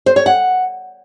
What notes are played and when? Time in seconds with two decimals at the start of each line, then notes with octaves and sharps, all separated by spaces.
0.06 C5
0.16 C#5
0.26 F#5